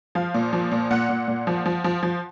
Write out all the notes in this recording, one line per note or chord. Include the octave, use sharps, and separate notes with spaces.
F3 F5
A#2
F3
A#2
A#2 F#5
A#2
A#2
F3
F3
F3
F3